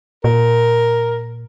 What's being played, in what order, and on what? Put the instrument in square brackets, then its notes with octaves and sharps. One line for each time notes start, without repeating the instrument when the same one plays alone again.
[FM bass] A#2 [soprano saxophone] A#4